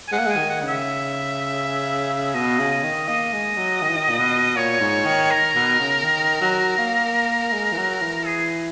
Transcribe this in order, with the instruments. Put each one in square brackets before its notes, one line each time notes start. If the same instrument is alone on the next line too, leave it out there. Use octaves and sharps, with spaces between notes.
[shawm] G#5
[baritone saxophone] G#3 [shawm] F#5
[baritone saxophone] A#3
[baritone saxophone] G#3 [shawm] G#5
[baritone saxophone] D#3
[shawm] F#5
[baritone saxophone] C#3 [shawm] F#5
[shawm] E5
[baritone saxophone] B2 [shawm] D#5
[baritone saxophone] C#3
[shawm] D#5
[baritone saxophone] D#3
[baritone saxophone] A#3 [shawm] D#5
[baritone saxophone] G#3
F#3
D#3
E3
D#3
A#2
B2
[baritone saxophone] A#2 [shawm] C#5
[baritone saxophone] G#2
D#3
[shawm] A#4
[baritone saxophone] B2
C#3
D#3
F#3
A#3
G#3
E3
F#3
E3
[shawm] G#4